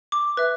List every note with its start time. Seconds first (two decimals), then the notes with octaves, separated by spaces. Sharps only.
0.12 D6
0.37 B4 E5